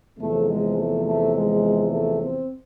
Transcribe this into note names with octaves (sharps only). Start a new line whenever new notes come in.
E2 C3 F3 A3
G#3
A3
A3
G#3
A3
C4